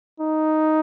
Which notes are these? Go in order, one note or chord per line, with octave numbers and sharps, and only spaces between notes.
D#4